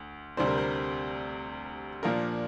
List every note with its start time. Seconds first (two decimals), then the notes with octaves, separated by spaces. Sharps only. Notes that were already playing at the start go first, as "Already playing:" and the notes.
Already playing: D2
0.37 D2 C3 G3 D4 C5
0.47 A#4
0.58 C5
2.03 A#2 F3 A#3 D4 A#4